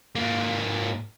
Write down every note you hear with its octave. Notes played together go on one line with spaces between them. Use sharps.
G#2 A#3